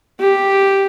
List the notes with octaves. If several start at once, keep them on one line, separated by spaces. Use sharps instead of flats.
G4